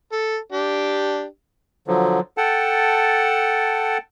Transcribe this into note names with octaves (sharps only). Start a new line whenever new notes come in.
A4
D4 G4
D3 F3 F#3
A4 F#5 G5 A5